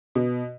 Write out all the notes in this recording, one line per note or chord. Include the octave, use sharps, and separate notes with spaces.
B2